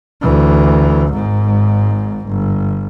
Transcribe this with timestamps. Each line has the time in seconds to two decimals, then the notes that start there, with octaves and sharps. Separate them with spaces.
0.21 D2 E3
1.12 G#1 G#2
2.27 G1